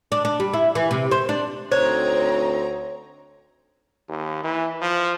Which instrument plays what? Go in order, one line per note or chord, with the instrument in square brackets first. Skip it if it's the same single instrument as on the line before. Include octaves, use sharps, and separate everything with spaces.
[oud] D4
D4
G3
E4
E3
C3
C5
D4
[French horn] D2 [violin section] C4 D#4 A#5 [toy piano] C5 [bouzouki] C#5
[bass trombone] D#2
E3
F3